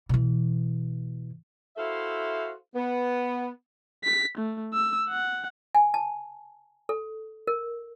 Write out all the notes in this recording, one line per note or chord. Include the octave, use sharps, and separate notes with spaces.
B2 E3
E4 F#4 A4 C5 E5 F5
B3
B6
A3
E6
F#5
G#5
A5
A4
A#4